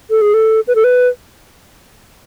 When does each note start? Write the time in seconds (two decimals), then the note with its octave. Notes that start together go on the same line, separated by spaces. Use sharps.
0.10 A4
0.21 G#4
0.34 A4
0.68 B4
0.75 A4
0.84 B4